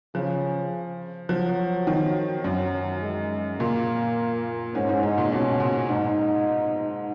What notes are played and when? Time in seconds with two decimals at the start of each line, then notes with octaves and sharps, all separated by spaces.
0.15 C#3 F3
1.29 F3 F#3
1.87 D#3
2.44 F#2 F#3
3.02 G#3
3.59 A#2 A#3
4.74 G#2 C#4
4.89 G#2
5.03 G#2 D#4
5.18 A#2
5.32 B2 C#4
5.60 A#2
5.89 G#2 D#4